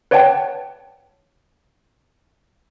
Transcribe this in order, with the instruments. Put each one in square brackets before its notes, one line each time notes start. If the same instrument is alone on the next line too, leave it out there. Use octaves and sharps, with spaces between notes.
[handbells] B4 C#5 D5 F#5 G5 A5